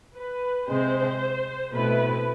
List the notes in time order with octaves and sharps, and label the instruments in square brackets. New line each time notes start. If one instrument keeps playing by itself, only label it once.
[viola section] B4
[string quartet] C3 G#3 C4 [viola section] C5
[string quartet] B2 A3 C4 E4 [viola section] B4